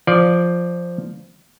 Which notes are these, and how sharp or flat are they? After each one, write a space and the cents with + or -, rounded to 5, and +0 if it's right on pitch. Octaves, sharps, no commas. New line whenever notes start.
F3 +0 D5 +0